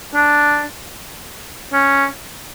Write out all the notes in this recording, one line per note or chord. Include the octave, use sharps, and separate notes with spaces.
D4
C#4